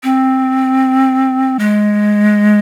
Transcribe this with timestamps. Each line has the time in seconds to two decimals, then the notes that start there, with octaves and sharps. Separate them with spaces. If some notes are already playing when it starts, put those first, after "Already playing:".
0.03 C4
1.59 G#3